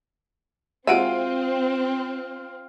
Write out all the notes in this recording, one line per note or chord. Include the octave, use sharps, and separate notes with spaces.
G#3 C4 F4 F#4 E5 D7 D#7